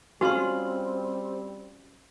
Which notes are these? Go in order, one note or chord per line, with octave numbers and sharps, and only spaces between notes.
G3 C4 C#4 F4 F#4 C6